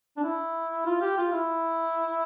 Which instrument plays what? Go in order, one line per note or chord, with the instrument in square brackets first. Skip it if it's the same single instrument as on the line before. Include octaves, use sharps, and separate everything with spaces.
[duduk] D4
E4
F4
G4
F4
E4